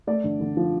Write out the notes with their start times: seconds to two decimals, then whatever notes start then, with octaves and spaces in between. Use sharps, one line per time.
0.07 A3 D5
0.24 D3
0.40 D3
0.57 F3